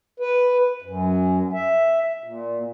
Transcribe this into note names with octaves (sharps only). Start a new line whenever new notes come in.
B4
F#2
E5
A#2